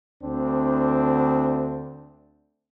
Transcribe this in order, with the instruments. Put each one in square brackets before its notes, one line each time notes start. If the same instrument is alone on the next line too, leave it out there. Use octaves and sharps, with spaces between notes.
[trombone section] D2 C4 D4